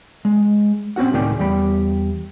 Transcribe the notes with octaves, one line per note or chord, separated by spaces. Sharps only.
G#3
C4 C#4 F#4 F#5
C#2 A2 D#3 G#4 D5 G5
E2 G3 G4 B5